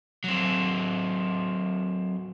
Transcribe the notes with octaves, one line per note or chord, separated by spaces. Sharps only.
F#3 C4